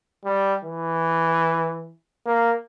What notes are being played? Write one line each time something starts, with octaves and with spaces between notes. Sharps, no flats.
G3
E3
A#3